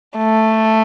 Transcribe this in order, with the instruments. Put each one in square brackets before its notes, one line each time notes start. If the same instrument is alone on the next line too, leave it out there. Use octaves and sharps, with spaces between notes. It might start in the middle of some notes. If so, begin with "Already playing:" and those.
[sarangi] A3